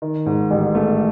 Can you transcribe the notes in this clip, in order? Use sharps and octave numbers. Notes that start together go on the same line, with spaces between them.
D#3
G#2
A1
A3